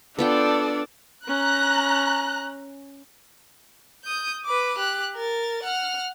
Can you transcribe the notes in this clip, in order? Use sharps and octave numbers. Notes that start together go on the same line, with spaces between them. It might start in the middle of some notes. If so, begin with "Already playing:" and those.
B3 D4 F4 A4 D5 G5
C#4 A#5 F#6
D#6 G6
B4 D6
G4 F#6
A#4 A6
F#5 F6